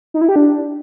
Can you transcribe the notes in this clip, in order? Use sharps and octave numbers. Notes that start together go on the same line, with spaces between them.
D#4
E4
G4
D4